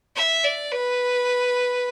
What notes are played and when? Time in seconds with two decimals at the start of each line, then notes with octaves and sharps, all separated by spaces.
0.16 E5
0.44 D5
0.72 B4